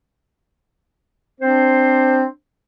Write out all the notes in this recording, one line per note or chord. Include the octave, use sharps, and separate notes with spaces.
C4 D4 C5